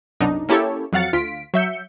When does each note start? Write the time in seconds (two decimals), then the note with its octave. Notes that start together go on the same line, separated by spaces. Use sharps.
0.20 C2 F#2 B2 D4 D#4
0.49 A#3 C#4 E4 G4 A4 C#5
0.92 F2 F#3 F5 F#5 A6 C#7
1.13 D2 F4 B6 D7
1.54 F#3 E5 G6 C#7